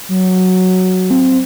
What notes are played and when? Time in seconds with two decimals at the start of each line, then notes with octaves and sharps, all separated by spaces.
0.09 F#3
1.11 C4